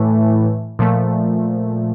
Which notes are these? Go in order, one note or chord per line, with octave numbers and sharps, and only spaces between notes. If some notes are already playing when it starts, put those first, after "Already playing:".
Already playing: A2 E3 A3
A#2 F3 A3